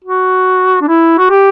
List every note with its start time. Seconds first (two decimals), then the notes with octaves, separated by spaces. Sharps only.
0.05 F#4
0.81 D4
0.88 E4
1.18 F#4
1.30 G4